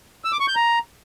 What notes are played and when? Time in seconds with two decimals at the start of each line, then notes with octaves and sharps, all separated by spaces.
0.25 E6
0.32 D6
0.40 C#6
0.48 G6
0.56 A#5